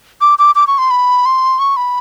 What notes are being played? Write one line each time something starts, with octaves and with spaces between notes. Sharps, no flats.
D6
D6
D6
C#6
C6
B5
C6
C#6
B5